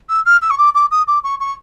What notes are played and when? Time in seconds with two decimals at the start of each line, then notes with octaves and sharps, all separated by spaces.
0.09 E6
0.25 F6
0.42 E6
0.50 C#6
0.58 D6
0.74 D6
0.91 D#6
1.07 D6
1.24 C#6
1.40 C#6